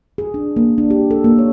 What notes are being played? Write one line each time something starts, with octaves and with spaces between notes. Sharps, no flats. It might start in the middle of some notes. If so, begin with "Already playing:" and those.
G#4
D4
A#3
D4
G4
A4
A#3
C#5